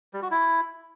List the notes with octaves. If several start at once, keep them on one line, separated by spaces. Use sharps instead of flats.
G3
F#4
E4